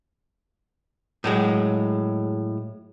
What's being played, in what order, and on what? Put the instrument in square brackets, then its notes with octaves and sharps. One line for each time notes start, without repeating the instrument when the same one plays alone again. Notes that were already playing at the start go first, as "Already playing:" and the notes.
[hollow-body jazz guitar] A2 F#3 G#3